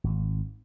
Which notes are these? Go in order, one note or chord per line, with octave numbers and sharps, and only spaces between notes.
G#1